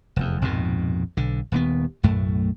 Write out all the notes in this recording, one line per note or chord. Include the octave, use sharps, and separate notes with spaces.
F1 E2
A#1 F2 G#2 B2
B1 D3
D#1 D#2 B3
B1 F#2 A2 A3